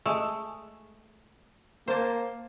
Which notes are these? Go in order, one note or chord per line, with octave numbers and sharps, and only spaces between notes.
G#3 A3
A#3 C5 A5